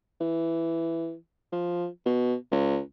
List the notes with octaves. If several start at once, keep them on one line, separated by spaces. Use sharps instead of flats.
E3
F3
B2
C#2